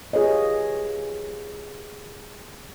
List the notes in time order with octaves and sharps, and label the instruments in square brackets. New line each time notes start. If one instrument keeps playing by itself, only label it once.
[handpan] F4 G4 G#4 B4 C#5 D#5